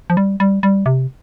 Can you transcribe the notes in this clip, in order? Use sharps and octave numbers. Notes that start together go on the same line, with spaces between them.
F3
G3
G3
G3
C3